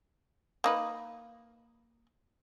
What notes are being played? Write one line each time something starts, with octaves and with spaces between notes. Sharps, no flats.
A#3 D#4 B4